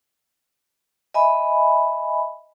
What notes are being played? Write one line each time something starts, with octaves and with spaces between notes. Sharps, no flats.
D#5 E5 G#5 B5